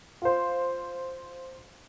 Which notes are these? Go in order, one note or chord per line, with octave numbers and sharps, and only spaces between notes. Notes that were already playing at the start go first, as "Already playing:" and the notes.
F4 C5